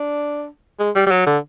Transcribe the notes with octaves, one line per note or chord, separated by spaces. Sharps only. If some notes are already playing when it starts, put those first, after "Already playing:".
Already playing: D4
G#3
G3
G3
F#3
D3